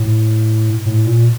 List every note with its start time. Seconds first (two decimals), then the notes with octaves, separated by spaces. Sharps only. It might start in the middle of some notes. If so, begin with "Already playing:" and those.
Already playing: A2
0.86 A2
1.06 A#2